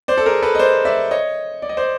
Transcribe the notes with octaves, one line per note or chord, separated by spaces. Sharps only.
C5 D5
A4
G#4 A#4
A4 B4
D#5
C5 D5
D5 E5
C#5 D#5
D5
D#5
C5 D5